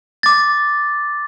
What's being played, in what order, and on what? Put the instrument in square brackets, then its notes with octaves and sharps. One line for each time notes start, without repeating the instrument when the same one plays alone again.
[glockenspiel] D6 A6